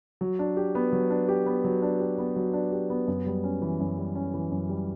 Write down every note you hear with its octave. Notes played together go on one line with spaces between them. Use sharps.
F#3
D4
G4
B3
F#3
D4
G4
B3
F#3
D4
G4
B3
F#3
D4
G4
B3
F#2
G3
C#4
E3
F#2
G3
C#4
E3
F#2
G3